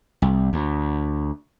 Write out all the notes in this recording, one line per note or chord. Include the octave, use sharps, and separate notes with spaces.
C2
D2